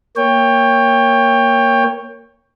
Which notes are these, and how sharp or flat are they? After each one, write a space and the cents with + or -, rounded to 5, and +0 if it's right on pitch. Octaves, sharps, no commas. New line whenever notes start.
A#3 +0 C#5 +0 G5 +20